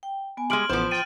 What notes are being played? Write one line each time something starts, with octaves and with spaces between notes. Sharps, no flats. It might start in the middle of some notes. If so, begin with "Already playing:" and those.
G5
B3 G#5
G3 G#3 C6 F6 D7 F#7
A1 F3 B3 C5 D6
G5 A6 D7 D#7